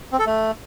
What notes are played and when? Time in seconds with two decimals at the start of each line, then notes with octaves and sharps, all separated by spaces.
0.12 C4
0.19 A4
0.26 A3